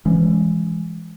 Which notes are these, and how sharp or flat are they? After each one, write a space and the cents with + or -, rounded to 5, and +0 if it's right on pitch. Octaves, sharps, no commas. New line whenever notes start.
E3 +25 G#3 +0 C#4 -25